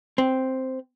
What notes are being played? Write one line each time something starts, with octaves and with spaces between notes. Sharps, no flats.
C4